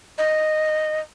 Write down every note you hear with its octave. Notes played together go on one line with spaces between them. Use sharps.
D#5